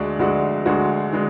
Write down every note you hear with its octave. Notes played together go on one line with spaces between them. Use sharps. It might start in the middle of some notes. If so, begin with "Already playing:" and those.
Already playing: D2 D3 G#3 D4 F#4
D2 D3 G#3 D4 F#4
D2 D3 G#3 D4 F#4
D3 G#3 D4